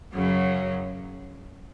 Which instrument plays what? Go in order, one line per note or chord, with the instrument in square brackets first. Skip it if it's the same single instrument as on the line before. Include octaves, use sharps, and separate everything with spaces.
[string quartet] F#2 C#3 F#3